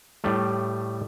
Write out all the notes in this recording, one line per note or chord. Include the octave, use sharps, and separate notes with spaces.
A2 G3 A3